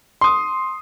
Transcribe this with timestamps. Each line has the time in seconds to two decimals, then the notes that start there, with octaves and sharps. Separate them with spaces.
0.21 C6 D#6